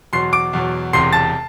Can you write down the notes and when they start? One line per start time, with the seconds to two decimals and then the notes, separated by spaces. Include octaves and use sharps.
0.13 E2 B2 F#3 C6 C7
0.33 D6 D7
0.53 E2 B2 F#3
0.93 E1 E2 C3 C6 C7
1.13 A5 A6